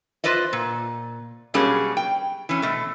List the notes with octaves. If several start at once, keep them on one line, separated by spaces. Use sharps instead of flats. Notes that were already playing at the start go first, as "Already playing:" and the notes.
F4 B4 C5 D5 D#5
A#2
B2 F#3 G3 A#3 C#4 G#4
G5
E3 C#4
B2 A3